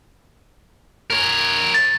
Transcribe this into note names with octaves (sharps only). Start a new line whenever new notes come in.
A#4 C#5
A6